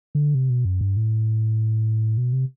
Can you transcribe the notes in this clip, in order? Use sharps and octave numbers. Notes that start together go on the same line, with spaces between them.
D3
C3
B2
F#2
G2
A2
B2
C3